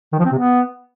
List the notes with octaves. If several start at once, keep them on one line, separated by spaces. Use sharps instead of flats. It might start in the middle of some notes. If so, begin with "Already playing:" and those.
D#3
F3
C4
C3
B3